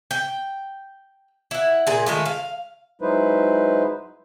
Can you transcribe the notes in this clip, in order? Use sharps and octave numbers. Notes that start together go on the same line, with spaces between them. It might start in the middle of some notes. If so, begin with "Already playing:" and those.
G5
E4 F#5
A#2 G#4
D#3 G#3 A3 F4
F5
F#3 G#3 D#4 E4 B4 C5